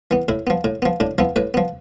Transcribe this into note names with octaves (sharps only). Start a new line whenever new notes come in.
E3 B3
A2 E4
F3 B3
A2
F3 B3
A2 D4
F3 B3 E4
A2 B4
F3 B3